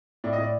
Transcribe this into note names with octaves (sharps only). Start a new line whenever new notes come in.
A2 D5
D#5
A2 D5